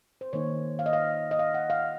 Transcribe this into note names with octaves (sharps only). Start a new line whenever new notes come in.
C5
D#3 A#3 D#4 C#5
F5
D#5
F5
D#5
F5
F#5
F5